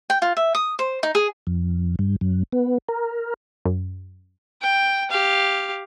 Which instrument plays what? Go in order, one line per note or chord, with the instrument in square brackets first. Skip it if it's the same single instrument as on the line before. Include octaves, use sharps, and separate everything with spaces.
[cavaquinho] G5
F4
E5
D#6
C5
D#4
G#4
[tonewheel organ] F2
G2
F#2
B3
A#4
[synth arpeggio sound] F#2
[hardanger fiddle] G5
G4 F5